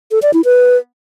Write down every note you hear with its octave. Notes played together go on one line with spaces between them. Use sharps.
A4
D5
E4
B4